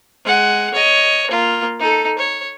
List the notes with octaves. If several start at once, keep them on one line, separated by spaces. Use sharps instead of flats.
G#3 F#5
C#5 D#5
A#3 F4
D#4 A4
C#5